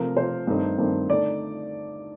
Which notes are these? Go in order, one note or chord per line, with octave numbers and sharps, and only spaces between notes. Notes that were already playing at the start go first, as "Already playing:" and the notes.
Already playing: C3 F3 A3 A#4
C3 F3 A3 C5
G2 D#3 A3 C4 D#4
G2 D#3 A3 C4 D#4
D3 A3 D#4 D5